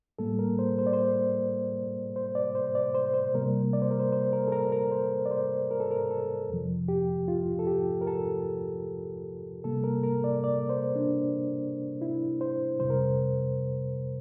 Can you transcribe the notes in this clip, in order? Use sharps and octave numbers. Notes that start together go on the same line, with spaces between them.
A2 G3 A#3 A4
A#4
C5
C5
D5
C5
C5
D5
C5
D5
C5
C5
C3 G3 A#3 A#4
D5
C5
A#4
C5
C5
A#4
A4
A#4
A#4
C5
D5
C5
A#4
A4
A#4
A4
F2 C3 F3
G4
F4
A4
G4
A#4
A4
C3 G3 A#3 A4
A#4
A#4
D5
D5
C5
D4
E4
C5
F2 C3 G3 C5
A#4